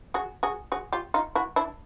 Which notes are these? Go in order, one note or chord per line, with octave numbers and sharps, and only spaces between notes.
F#4 G#4
F#4 G#4
F#4 G#4
F4 G4
D#4 F4
E4 F#4
D4 E4